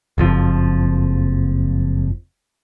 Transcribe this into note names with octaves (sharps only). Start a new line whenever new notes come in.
F#1 F2 F3